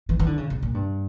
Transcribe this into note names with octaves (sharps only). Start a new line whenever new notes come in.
E3
E3
D3
C#3
B2
A#2
G2